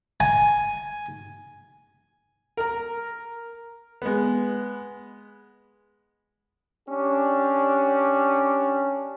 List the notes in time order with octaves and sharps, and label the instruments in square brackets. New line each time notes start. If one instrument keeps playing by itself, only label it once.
[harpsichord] G#5
[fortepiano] A#4 A#5
G#3 B3
[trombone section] C#4 D4 G4